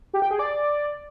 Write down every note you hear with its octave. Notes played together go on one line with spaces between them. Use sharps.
G4
G5
G#4
D5